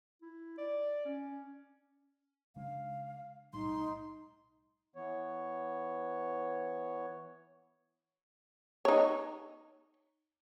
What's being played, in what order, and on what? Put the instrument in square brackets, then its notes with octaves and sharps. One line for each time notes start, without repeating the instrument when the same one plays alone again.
[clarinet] E4
D5
C#4
[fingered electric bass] C#3 G#3 D4 [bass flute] F5
[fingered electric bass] B1 A2 G3 [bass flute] D#4 [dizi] C6
[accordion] E3 B3 C#5
[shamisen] D#4 C#5